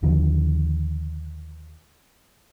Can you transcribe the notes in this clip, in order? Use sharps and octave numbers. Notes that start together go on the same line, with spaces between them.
D#2 D3 F3